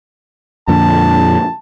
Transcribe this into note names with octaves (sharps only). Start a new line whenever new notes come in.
F2 A#2 D3 A5